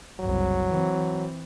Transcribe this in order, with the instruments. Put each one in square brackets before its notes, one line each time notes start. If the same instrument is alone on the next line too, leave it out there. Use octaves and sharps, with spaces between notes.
[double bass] F#1 C2 [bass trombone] F#3
[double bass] E3 C4